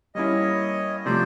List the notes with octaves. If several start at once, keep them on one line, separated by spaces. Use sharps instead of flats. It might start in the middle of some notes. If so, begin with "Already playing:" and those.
G3 A#3 C#4 E4 C#5 D#5
C3 F3 A3 C5 D5